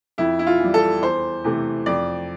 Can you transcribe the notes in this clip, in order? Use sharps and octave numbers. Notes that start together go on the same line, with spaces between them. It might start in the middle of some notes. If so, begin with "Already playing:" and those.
F2 E4
E4
F4
E3 G3
A4
E2 C5
C3 E3 A3
F2 D5